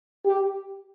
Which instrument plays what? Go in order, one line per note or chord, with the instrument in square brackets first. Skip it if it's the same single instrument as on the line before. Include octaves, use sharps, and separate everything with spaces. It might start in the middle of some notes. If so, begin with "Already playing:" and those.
[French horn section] G4